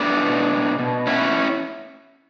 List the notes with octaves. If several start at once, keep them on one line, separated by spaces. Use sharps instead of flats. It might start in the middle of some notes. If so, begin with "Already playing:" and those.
Already playing: A3 B3 D4
B2
B2
B2
B3 C#4 E4